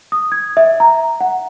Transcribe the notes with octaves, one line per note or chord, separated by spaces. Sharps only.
D#6
G#6
E5
A#5
F#5